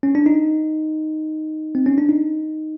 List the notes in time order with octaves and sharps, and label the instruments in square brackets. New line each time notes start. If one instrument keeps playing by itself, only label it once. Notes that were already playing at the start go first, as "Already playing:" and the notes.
[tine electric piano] C#4
D4
D#4
C4
C#4
D4
D#4